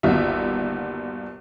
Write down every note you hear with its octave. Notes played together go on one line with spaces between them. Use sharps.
G1 D#2 D#4 F4 F#4 E5